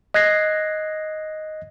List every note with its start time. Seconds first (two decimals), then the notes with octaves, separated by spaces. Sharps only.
0.14 D#5 F#6 G#6 A#6 C7